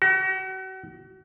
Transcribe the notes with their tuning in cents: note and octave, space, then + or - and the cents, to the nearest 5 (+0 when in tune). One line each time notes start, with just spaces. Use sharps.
F#4 +40